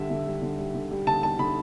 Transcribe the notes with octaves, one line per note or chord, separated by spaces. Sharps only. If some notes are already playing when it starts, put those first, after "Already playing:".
Already playing: D3 G3 E5
D3
G3
D3
G3
D3
G3
D3 A5
G3 A5
D3 B5